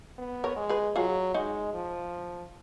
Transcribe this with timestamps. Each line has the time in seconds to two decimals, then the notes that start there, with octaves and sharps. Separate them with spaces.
0.18 B3
0.44 A#4 C#5
0.57 G#3
0.69 G#4 B4
0.96 F#3 F4 G#4
1.34 G#3 D#4 F#4
1.74 F3